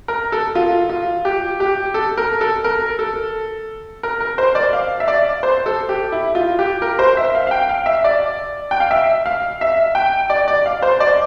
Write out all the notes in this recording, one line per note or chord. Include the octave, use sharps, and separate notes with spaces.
A#4
A4
F4
F4
G4
G4
A4
A#4
A4
A#4
A4
A#4
A#4
C5
D5
F5
E5
D5
C5
A4
G4
E4
F4
G4
A#4
C5
E5
F5
F5
G5
F5
E5
D5
G5
F5
E5
F5
E5
G5
D5
D5
F5
C5
D5